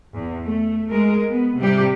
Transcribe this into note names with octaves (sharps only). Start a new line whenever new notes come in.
E2
A3
G#3 A#4
B3
C3 G3 G4